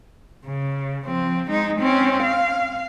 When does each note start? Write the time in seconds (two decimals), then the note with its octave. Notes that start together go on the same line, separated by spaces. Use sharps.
0.46 C#3
1.05 F3 C4
1.49 G#3 D#4
1.79 C4 C#4
2.23 F5